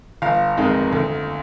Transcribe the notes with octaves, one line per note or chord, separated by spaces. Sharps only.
G1 F5
F2 D#3 G#3
D2